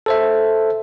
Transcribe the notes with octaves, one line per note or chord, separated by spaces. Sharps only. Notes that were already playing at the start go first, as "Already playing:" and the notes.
A4 C5 E5